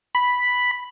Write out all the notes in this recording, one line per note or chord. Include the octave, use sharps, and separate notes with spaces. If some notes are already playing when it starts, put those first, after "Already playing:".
B5